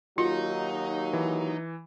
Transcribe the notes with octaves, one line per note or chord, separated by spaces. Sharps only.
D#2 F#3 D#4 F4
E3